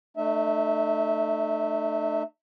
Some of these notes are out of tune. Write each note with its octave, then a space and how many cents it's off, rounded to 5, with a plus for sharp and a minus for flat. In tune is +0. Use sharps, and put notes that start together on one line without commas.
A3 +0 D#4 -45 E5 -20